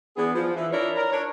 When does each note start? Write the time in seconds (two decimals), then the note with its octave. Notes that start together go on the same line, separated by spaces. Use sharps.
0.17 E3 B3 D4 G#4
0.35 F3
0.55 E3
0.72 D4 E4 F4 A#4 C#5 D5
0.96 A#4
1.12 D4 C#5